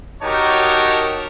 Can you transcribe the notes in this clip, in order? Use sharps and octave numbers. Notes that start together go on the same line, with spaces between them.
D#4 F#4 G4 A#4 C#5 A5